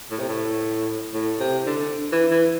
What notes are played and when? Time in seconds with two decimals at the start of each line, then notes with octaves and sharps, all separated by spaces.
0.11 A2
0.19 C3
0.29 A2
1.14 A2
1.40 C3
1.66 D3
2.12 E3
2.31 E3